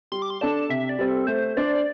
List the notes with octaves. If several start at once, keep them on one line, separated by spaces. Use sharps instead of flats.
G3 C6
D6
C6
D4 A4 D5 A5
C3 E5
D5
G3 C4
A4
A3 C5
D4 C5 D5
D5